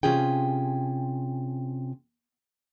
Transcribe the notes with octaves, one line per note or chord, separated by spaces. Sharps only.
C3 A3 C#4 F4 G#4 G5